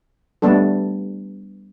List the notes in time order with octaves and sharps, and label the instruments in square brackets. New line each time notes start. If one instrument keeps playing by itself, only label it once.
[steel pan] G3 A3 B3 D4 A4